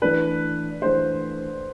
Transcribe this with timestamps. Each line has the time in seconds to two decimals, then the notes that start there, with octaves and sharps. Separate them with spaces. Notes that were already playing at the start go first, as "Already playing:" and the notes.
0.02 E3 A3 D4 B4
0.82 E3 A3 D4 C5